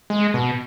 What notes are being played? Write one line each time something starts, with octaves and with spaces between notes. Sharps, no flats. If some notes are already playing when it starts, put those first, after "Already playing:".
G#3
B2